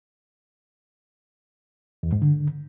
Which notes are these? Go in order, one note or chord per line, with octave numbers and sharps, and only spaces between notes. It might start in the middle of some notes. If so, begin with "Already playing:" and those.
E2
G#2
D3